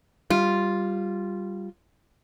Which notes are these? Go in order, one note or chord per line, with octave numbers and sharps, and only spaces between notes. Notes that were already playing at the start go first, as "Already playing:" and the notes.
G3 F4